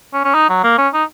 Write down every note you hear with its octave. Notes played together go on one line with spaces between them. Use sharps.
C#4
C#4
D#4
F#3
A#3
C#4
D#4